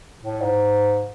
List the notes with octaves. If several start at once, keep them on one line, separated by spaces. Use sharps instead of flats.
A2
G#2